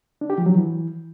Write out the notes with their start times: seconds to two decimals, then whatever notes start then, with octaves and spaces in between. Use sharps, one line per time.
0.21 D4
0.30 G4
0.38 F3
0.46 F#3
0.55 E3